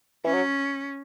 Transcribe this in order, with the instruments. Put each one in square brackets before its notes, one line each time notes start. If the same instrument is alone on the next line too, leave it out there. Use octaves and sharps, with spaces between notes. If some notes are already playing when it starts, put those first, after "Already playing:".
[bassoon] E3 [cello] C#4
[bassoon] F#3